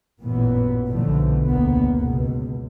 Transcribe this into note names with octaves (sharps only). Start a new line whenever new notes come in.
A1 F#2 A#2 E3 B3
B1 B2 D3 E3 F3 A3
F#1 D2 A#3 B3
C#2 B2